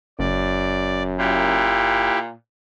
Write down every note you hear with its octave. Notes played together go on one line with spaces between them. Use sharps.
F#1 F#2 D5
A#2 E4 G4